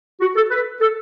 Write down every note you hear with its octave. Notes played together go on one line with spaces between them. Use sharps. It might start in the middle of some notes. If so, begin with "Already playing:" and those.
F#4
A4
B4
A4